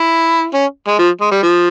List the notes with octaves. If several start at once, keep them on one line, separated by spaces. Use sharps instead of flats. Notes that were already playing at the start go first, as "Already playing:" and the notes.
Already playing: E4
C#4
G#3
F3
G#3
G3
F3